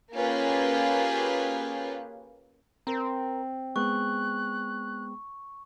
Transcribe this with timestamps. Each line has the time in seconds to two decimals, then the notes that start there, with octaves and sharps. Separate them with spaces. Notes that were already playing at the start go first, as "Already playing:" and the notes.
0.13 A#3 C#4 F4 G4 G#4 B4
2.87 C4 A#4 A#5
3.76 G#3 B3 G#4 C#6 F#6